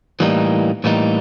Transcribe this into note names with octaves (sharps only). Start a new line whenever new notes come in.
A2 E3 G3 A#3 D#4
A2 E3 G3 A#3 D#4